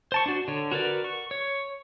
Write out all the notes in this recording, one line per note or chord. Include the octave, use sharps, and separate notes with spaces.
C5 A5 C#6
D4 F#4
D3 C#5
F#4 A#4 B4 D5
C#6
C#5